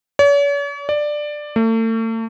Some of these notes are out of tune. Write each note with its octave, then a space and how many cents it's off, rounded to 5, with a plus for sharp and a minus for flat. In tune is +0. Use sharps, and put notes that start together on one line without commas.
C#5 +45
D5 +10
A3 +40